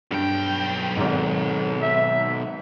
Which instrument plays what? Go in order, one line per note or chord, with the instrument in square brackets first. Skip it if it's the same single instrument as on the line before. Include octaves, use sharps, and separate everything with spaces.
[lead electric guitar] B1 G5 [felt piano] G2
[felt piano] G#1 G#2
[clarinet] E5